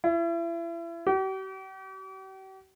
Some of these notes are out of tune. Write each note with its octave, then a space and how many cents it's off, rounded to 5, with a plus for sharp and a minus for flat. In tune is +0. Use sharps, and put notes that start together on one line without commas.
E4 +35
G4 -45